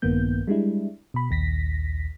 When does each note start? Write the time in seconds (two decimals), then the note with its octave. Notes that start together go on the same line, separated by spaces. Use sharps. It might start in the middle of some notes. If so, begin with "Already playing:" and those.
0.02 A#1 G2 D#3 A#3 B3 G6
0.47 G3 G#3 D4 E4
1.14 B2 B5
1.30 A#1 D#2 A#6 B6